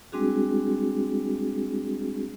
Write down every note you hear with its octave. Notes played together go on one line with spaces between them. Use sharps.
G3 G#3 C4 D4 F#4 G#4